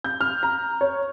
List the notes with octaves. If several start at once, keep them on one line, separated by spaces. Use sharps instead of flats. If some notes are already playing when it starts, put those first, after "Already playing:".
G6
F6
A#5
C#5